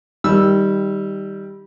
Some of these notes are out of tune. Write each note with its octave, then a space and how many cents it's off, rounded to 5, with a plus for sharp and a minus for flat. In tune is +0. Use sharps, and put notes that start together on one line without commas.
D#3 +20 G3 +0 E6 +0